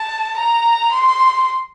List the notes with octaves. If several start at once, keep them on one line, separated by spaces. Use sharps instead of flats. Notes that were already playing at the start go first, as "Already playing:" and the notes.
Already playing: A5
A#5
C6